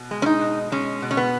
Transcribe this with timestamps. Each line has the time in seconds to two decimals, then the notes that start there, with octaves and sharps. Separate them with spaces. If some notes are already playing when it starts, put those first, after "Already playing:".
Already playing: B2
0.11 G#3
0.22 C#4
0.26 D#4
0.41 B2
0.72 G#3 C#4
1.02 B2
1.11 C#4
1.17 B3